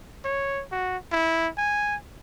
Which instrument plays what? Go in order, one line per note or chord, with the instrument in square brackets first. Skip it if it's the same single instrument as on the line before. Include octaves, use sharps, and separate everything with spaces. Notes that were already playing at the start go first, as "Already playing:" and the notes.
[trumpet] C#5
F#4
E4
G#5